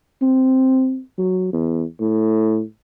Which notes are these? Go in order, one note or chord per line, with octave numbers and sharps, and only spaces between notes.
C4
F#3
E2
A2